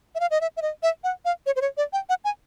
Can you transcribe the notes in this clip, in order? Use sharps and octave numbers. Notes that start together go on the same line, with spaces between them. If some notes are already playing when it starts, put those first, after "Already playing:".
E5
F5
D#5
E5
E5
D#5
E5
F#5
F5
C#5
C5
C#5
D5
G5
F#5
G#5